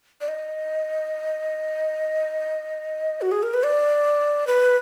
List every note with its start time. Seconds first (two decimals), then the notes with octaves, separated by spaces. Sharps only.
0.21 D5
0.28 D#5
3.21 F#4
3.32 G#4
3.43 A#4
3.54 B4
3.63 D5
4.47 B4